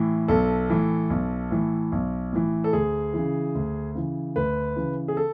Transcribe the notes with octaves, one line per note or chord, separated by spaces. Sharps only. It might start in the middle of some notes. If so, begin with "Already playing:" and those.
Already playing: A2 E3
B1 A4
A2 E3
B1
A2 E3
B1
A2 E3
A4
D2 G#4
C#3 E3
D2
C#3 E3
D2 B4
C#3 E3
G#4
A4